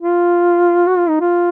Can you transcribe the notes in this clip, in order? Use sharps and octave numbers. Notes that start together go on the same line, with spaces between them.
F4
F#4
F4
D#4
F4